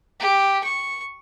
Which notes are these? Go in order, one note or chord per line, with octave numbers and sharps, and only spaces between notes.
G4
C#6